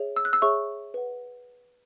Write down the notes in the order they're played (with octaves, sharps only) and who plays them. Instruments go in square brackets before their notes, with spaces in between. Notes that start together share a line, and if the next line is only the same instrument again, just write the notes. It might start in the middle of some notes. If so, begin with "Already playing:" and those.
Already playing: [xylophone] G#4 C#5 E5
E6
F#6
E6
G#4 C#5 E5 C#6
B4 F#5